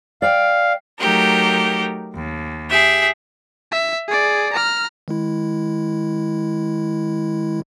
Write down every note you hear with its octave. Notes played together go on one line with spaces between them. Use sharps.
D5 F5 G5
F#3 A3 D#4 G4 A#4
D#2
G4 G#4 E5
E5
G#4 D5
A#5 F6
D#3 G#3 E4